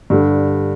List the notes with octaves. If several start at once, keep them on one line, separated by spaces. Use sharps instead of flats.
G2 D3 G3